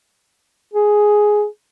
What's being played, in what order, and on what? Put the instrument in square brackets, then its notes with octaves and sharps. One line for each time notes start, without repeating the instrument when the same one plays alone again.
[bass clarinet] G#4